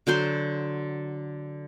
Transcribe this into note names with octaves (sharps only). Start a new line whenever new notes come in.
D3 F#3 C5 C6